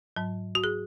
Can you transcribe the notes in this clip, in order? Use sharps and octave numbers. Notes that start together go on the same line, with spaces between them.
G#2 F#3
F#4
G#4